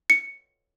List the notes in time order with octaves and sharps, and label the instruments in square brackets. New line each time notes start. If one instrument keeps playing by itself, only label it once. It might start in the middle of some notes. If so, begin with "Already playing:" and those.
[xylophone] C#7